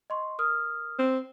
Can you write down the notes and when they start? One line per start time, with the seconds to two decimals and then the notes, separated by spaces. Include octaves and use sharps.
0.10 D#5 C6 C#6
0.39 A#4 D#6 F6
0.99 C4